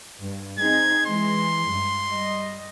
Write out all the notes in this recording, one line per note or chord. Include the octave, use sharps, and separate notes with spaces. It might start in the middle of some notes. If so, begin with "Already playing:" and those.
G2
C4 D#4 G#4 G#6
E3 G#3 C6
G2
G3 D#5